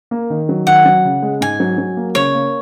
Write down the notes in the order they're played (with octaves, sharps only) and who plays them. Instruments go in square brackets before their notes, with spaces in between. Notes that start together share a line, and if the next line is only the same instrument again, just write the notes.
[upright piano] A#3
D#3
F#3
[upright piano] D#3 [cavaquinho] F#5
[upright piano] F#3
C#3
G#3
[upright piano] G#2 [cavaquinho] G#5
[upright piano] F#3
F#3
A#3
[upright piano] C#3 [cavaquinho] C#5
[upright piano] A#3